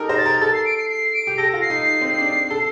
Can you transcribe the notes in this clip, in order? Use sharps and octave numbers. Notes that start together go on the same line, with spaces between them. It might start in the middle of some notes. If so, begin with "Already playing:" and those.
Already playing: D#4 G4 A4 A#4
C5 A#6
A6
A#4
A4 A6
C7
D7
C7
C7
D7
G4
A4 A#6
F4 A#6
C7
D#4
C4
D4
A4